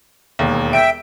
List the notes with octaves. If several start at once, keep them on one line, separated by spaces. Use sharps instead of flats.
E1 D#2
E5 G5 D7